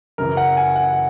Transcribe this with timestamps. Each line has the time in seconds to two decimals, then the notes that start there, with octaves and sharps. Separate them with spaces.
0.18 F#2 C#3 E3 A#4
0.37 F#5
0.57 G#5
0.76 F#5